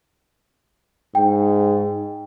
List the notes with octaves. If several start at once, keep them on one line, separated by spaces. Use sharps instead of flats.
G#2 G5